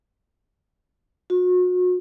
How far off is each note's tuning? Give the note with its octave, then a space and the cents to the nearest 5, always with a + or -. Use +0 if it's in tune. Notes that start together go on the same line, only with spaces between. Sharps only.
F#4 -35